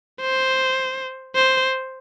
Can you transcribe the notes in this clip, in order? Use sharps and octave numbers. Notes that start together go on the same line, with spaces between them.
C5
C5